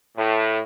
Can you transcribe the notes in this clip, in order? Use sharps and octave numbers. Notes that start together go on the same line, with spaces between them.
A2